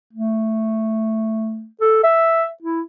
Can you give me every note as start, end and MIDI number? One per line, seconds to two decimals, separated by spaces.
0.13 1.66 57
1.81 2.02 69
2.04 2.46 76
2.63 2.81 64